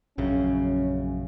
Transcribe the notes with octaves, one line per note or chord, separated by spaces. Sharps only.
A#1 F#2 C#3 C#4